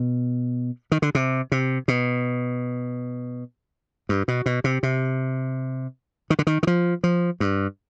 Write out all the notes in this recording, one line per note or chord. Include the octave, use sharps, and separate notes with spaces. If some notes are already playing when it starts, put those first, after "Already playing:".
Already playing: B2
D#3
D3
C3
C3
B2
G2
B2
B2
C3
C3
D#3
D3
D#3
D#3
F3
F3
G2